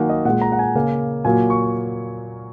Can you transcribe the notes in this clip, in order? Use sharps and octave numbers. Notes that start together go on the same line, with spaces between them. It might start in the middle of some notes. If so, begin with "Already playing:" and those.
Already playing: D#3 F#3 A#3 F#5 G#5
D#5
A#2 G#3 F#5
A#5
F#5
G#5
C#3 A#3
A#2 F#3 A#3 G#5
C#6